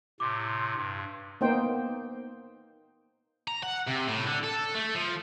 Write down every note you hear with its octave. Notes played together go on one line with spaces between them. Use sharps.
A2 C3 C6 D6
G2
A#3 B3 D#4 C5 G5
A#5
F#5
C3
A2
D3
A4
A3
F3